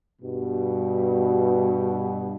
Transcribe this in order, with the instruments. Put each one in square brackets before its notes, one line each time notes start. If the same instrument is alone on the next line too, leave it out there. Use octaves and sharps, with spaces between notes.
[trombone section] G2 B2